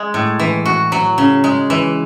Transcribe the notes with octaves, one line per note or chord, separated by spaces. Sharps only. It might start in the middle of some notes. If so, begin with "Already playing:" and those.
Already playing: G#3
A2
E3
F#4
F#3
C#3
G#3
E3